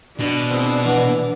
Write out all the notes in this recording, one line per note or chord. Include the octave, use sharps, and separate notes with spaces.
B2 D4
C4 E4 G#4
D3 E3 B3